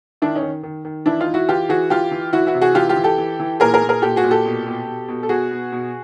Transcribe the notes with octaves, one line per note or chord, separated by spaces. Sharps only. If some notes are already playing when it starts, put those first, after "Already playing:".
D#3 D4 E4
C#4 D#4
D#3
D#3
D#3
E3 D4 E4
D#4 F4
E3
E4 F#4
E3 F4 G4
E3 F#4 G#4
E3 F4 G4
E3
E3 E4 F#4
E4 F#4
C3
F#4 G#4
E3 F4 G4
F4 G4
E3
G4 A4
E3
E3
A#2 G#4 A#4
G#4 A#4
A#2
G#4 A#4
A#2 G4 A4
F#4 G#4
A#2
G4 A4
B2
B2
B2
B2
A4
B2 F#4 G#4
B2
B2